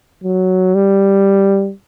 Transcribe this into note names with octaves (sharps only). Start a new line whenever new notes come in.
F#3
G3